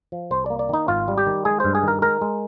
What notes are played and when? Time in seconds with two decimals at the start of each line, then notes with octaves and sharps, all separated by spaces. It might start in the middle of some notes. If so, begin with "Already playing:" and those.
0.12 F3
0.31 C2 C5
0.46 A#3 D5
0.59 D5
0.69 D#3 D#4
0.88 G#1 F4
1.08 G3
1.18 G4
1.27 D#3
1.45 G#3 G#4
1.60 G2 C5
1.75 G#4
1.83 D#3 A#4
2.02 G#3 A#4
2.21 G#3